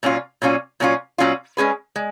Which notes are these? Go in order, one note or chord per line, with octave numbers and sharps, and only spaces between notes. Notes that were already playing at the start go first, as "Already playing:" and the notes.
A#2 F#3 C#4 F4
A#2 F#3 C#4 F4
A#2 F#3 C#4 F4
A#2 F#3 C#4 F4
G#3 C#4 G#4 B4
G#3